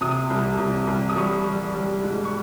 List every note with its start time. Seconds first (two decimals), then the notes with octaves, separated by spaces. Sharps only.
0.01 C3 D#6
0.30 C2
0.59 C2
0.87 C2
1.09 D#6
1.16 G3 C#6
1.46 G3
1.75 G3
2.04 G#2
2.25 C#6